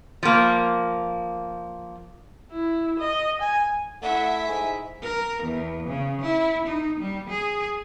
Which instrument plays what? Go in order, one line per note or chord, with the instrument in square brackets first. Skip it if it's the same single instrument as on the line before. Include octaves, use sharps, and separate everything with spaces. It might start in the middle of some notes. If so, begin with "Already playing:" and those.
[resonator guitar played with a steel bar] F3 A#3
[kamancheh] E4
D#5
G#5
[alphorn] A3 [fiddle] E4 E5 [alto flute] F#5
[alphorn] G#2 [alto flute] G#5
[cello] A#4
E2
C#3
E4
D#4
G3
G#4